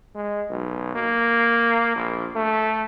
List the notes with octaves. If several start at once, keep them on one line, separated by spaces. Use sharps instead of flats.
G#3
B1
A#3
A#1
A3